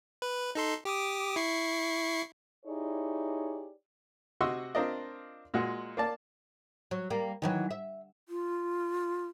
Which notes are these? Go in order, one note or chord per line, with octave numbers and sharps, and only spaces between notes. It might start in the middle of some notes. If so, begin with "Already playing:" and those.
B4
D#4 A4 C6
G4 D6 D#6
E4 C#6 C7
D#4 E4 G4 G#4 C#5 D5
C3 F#4 D#5 C6 C#6 E6
C4 D4 F4 A#4 D5 D#5
A#2 G#3 F#4
A#3 D5 A5
F#3
G3 A#3
D#3 E3 F#3
E5
F4